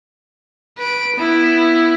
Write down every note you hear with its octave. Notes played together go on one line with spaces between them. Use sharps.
B4 D7
B3 E4